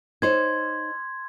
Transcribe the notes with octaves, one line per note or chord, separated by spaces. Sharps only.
D#4 C5 C#5 C6 G#6